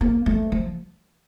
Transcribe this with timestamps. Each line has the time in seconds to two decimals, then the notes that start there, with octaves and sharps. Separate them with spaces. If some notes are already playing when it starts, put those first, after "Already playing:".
0.01 A#3
0.26 A3
0.52 F3